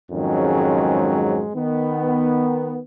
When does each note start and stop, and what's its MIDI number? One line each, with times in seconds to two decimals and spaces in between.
0.11 1.47 41
0.11 1.47 44
0.11 1.47 51
0.11 1.47 54
0.11 1.47 56
0.11 1.47 61
1.55 2.80 51
1.55 2.80 59